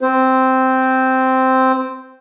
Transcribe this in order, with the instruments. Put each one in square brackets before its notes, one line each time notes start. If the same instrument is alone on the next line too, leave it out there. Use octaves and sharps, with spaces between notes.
[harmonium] C4 C5